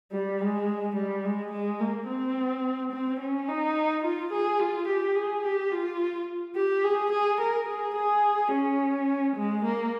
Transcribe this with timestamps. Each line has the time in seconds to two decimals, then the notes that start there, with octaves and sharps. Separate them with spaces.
0.12 G3
0.40 G#3
0.96 G3
1.24 G#3
1.52 G#3
1.80 A#3
2.08 C4
2.92 C4
3.20 C#4
3.48 D#4
4.03 F4
4.32 G#4
4.60 F4
4.88 G4
5.15 G#4
5.44 G4
5.71 F4
6.56 G4
6.84 G#4
7.12 G#4
7.41 A#4
7.68 G#4
7.96 G#4
8.51 C#4
9.36 G#3
9.64 A#3